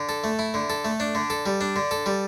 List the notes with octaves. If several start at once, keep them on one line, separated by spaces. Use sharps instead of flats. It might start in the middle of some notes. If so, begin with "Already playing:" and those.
Already playing: D3
A4
A3
E4
D3
A4
A3
D4
D3
A4
G3
D4
D3
A4
G3